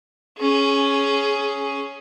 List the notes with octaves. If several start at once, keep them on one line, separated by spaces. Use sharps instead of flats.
C#4 G#4